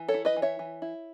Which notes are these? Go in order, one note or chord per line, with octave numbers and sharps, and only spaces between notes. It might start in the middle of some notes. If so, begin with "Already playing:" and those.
Already playing: E3
A4 C#5
E4
B4 D#5
E3
C#5 E5
E3
E4